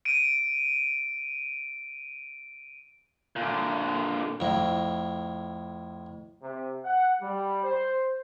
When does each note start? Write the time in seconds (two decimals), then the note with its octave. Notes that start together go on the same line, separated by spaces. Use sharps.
0.05 D7 D#7
3.36 A#2 D3
4.40 F2 A2
6.43 C3
6.85 F#5
7.21 G3
7.64 C5